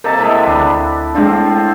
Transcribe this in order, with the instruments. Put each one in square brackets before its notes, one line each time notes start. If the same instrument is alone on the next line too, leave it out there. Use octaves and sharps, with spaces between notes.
[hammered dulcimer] C3 A#3 A4 [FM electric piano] A#4 D#5 A6
[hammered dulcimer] A2 G#3 E5
[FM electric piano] D2 B5 [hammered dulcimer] D4
[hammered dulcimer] A2 C4 F4 [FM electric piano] G#3 D4